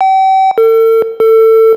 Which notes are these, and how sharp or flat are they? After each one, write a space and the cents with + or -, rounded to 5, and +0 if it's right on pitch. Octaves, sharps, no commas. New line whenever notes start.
G5 -40
A4 +40
A4 +25